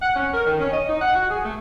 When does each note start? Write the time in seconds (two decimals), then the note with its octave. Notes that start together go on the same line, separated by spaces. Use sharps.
0.02 F#5
0.16 C#4
0.34 A#4
0.46 D#3
0.60 C#4
0.72 D#5
0.89 D#4
1.02 F#5
1.15 F#4
1.30 G#4
1.45 A3